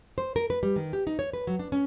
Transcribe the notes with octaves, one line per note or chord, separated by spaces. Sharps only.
C5
A#4
B4
G3
D#3
G4
D#4
C#5
B4
F#3
D4
C#4